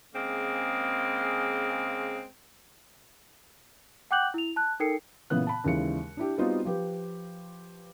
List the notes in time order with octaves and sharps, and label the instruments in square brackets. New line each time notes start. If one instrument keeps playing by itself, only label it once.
[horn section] C#3 G#3 A#3 C4
[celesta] F#5 G5 D6 F#6 G6 F#7
E4 F7
A5 F#6
D#4 A4 A#4 G5 C7 C#7
[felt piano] A#2 C#3 E3 B3 F#6
A5 B5
D#2 C#3 E3 G#3 C#7
D4 E4 G4
G3 B3 C4 D#4 F4 F#4
F3 G4 B4